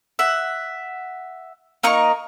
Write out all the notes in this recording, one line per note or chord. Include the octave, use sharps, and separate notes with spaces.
E5 F#5
A#3 D#4 D#5 C#6